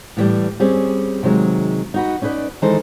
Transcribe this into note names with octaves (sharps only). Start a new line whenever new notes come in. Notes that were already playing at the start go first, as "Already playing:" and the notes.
A2 E3 G3
G3 C4 C#4 G#4
C3 D#3 F#3 G#3
D#4 F#4 B4
C#4 D#4 E4 B4 D5
D#3 E3 G#3 D#4 A4 C5